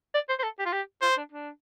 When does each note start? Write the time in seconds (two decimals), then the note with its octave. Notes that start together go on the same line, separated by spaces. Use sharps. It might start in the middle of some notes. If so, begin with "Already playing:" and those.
0.14 D5
0.29 C5
0.39 C5
0.43 A4
0.59 G4
0.66 F4
0.72 G4
1.02 F4 C5
1.17 D4
1.32 D4